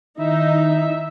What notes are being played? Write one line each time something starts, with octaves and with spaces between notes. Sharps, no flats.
D#3 D#4 E4 E5